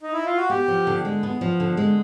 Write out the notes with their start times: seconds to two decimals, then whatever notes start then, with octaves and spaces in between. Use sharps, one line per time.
0.01 D#4
0.13 E4
0.25 F4
0.37 F#4
0.49 B3 G4
0.68 F3
0.87 D3
1.05 G#3
1.23 B3
1.41 F3
1.60 D3
1.77 G#3